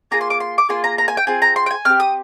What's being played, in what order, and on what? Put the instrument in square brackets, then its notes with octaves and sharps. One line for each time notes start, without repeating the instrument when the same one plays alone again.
[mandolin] A#3 F4 G#4 A#5
C6
D6
C6
D6
A#3 F4 G#4 C6
A#5
A#5
G#5
G5
C4 F4 G#4 G#5
A#5
C6
G5
G#5
C4 G4 F6
D#6